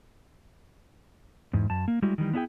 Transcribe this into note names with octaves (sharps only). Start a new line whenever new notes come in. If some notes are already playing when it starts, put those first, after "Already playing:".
E2 G#2
F#2 A5
A#3
G3 G#3 E4 F#4
D#3 E3 G3
B3 D4 E4 G#4 G5